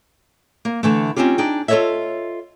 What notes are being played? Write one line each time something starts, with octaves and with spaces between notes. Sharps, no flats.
A#3
D3 E3 A3
C4 C#4 D#4 F4 G4
D4 D#4 G#4 G5
F4 A4 B4 C#5 D#5 E5